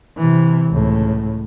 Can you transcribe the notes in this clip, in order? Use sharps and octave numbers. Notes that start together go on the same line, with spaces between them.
C3 E3
C#2 A2